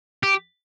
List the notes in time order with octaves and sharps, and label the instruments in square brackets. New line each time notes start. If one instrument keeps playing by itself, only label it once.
[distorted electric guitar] G4